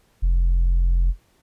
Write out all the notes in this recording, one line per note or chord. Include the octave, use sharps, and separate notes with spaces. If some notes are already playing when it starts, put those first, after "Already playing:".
F1